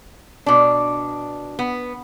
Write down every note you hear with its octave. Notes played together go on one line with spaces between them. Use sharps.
B2 D4
B3